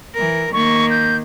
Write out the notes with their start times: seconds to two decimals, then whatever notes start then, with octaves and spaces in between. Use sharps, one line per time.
0.15 E3 A#4
0.53 D#3 A#3 C#6
0.90 G6